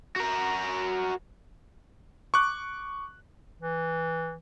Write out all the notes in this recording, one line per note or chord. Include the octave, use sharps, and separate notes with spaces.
F#4 A#4
C#6 D6 F#6
E3